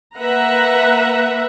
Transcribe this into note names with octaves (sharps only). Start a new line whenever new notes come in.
A#3 B4 E5 F#5 A#5